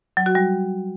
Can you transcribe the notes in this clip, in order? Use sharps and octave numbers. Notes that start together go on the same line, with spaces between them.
F#3
F#4
G3